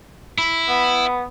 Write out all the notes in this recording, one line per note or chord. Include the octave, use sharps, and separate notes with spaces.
E4
B3